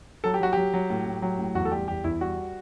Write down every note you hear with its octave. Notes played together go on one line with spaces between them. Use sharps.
F#3 A4
G4
F#3 F#4
F#3 G4
F#3
A2
A2
F#3
A2
E2 F#4
A4
G3 G4
E2 G4
E2 E4
G3 F#4